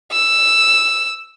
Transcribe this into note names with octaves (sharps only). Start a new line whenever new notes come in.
E6